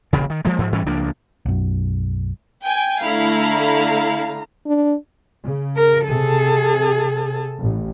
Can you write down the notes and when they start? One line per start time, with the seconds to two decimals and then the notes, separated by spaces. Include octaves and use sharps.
0.13 E1 A#1 A#2 C#3
0.30 D#3
0.45 F3 G#3 A#3
0.58 G#2 F3
0.72 G#2 E3 G3 C#4
0.86 C#2 F3 A#3 D4
1.46 B1 F#2
2.61 G5 G#5
3.02 D3 A3 E4 F5 A#5
4.66 D4
5.45 C#3
5.76 A#4
6.08 C3 G#4 A4
7.61 A1